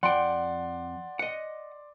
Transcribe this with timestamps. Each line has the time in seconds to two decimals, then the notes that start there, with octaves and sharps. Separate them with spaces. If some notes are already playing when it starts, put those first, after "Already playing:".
0.03 F2 D5 F#5 G5 C6
1.19 D#5 F#5